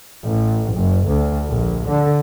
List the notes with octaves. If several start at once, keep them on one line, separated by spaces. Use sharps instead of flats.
A1
F#1
D2
A#1
D3